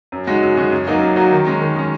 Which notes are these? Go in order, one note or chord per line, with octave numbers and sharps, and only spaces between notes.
F#2
C#3 G#3 D#4 F#4
F#2
C#3 G#3 D#4 F#4
F#2
F#3 A#3 D#4 F#4
F#2
F#3 A#3 D#4 F#4
D#3
G#3 C#4
D#3
G#3 C#4